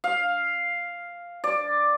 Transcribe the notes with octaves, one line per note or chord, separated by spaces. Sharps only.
F5
D5